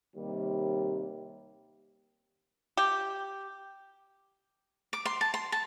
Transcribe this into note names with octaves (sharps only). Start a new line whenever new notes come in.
D#2 C3 G3
G4
D6
C6
A5
C6
A5